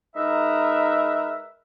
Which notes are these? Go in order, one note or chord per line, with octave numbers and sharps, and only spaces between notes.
G#3 D#4 A#4 B4 E5